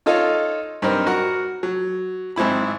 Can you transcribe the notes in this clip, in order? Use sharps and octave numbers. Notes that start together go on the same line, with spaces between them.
D#4 F4 A4 C#5 D#5 F5
G2 C4 D#4 A#4 C5
F#4 A#4 F#5
F#3
G#1 G#2 C4 E4 B5